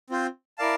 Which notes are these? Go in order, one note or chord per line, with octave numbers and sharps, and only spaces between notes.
C4 F4 C5
E4 A#4 D5 F5 A5